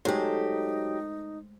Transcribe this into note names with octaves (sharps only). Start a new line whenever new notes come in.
F#3 G#3 A3 D#4 G4 C5